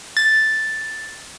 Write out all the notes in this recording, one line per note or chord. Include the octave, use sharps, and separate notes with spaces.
A6